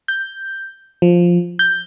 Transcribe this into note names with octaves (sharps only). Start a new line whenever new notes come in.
G6
F3
G6